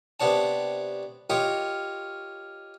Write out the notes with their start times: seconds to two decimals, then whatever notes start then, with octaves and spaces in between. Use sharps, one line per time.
0.20 C3 B3 D4 C#5 A5
1.30 F4 G4 A#4 C#5 D#5